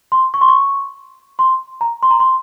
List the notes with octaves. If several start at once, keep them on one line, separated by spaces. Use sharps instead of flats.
C6
C#6
C6
C#6
C6
A#5
C6
A#5
C6